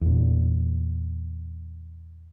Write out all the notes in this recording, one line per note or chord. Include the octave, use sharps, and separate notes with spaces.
E2 A#2